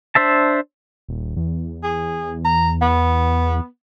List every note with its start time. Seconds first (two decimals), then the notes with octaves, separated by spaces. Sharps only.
0.15 D4 C5 E5 A5
1.08 D#1
1.36 E2
1.83 G#4
2.45 A#5
2.82 B3